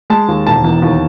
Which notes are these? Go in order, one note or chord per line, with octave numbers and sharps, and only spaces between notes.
G#3 A5
D#2
E1 A5
E2
D#2